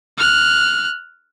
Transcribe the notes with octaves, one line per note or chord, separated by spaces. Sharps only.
F6 F#6